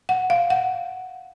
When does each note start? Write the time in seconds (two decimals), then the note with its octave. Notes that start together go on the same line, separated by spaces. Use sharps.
0.09 F#5
0.30 F5
0.50 F#5